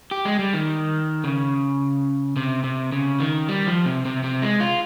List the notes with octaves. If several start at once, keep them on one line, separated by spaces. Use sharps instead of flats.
G4
G#3
G3
D#3
C#3
C3
C3
C#3
D#3
G3
F3
C3
C3
C3
G#3
F4